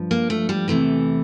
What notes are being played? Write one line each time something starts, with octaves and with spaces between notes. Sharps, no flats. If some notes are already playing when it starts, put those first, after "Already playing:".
Already playing: G2 F3
A#3
A3
G3
E2 C3 E3 A3